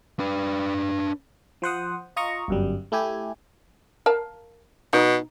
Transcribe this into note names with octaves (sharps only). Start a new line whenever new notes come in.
D4 B4
F3 C5 F#5 D#6
F4 D#5 A#5 C#6
G1 F#2 G3
A3 E4 G4 G#5
A#4 F5 A5
B2 D#4